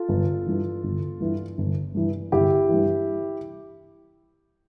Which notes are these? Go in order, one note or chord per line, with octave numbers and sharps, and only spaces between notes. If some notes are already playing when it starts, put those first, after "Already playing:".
Already playing: F4 A4
G1
G2 E3
G1
G2 E3
G1
G2 E3
G1 E4 G4
G2 E3